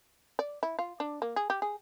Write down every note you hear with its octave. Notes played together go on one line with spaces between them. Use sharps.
D5
E4
F4
D4
A#3
G#4
G4
G#4